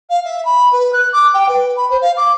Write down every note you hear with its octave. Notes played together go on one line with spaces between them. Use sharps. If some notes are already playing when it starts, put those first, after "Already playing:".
F5
E5
B5
B4
F#6
D6
G5
B4
B5
C5
F5
D6